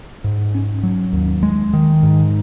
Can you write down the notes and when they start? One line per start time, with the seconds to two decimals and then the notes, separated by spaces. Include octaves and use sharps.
0.24 G#2
0.55 C#4
0.83 F#3
1.13 D#2
1.43 G#3
1.73 D#3
2.03 G#2